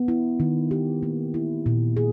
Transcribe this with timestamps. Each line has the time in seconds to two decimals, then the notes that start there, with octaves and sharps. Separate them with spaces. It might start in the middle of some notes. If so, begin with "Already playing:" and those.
Already playing: B3
0.08 E4
0.40 D#3
0.71 G4
1.03 A#3
1.34 E4
1.66 A#2
1.97 G#4